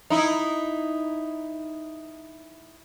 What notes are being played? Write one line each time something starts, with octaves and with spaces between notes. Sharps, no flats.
D#4 E4